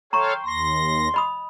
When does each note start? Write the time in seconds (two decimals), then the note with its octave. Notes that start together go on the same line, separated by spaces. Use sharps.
0.13 A4 C#5 F5 G5 A#5 C6 C#6
0.46 D#2 C6 A#6
1.14 D#5 B5 D#6